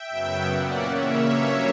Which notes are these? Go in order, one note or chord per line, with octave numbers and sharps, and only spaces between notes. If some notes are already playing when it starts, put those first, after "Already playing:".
Already playing: E5 G5
F#2 C#3 F#3 B3
A#2 A#3 C#4 D5 F#5
C#3 E3 A#3 C#4 C#5 E5
G2 F#3 A#3 C#4